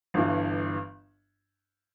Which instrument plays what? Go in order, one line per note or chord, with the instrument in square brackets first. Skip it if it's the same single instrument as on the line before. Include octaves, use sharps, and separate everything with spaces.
[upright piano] G1 G2 E3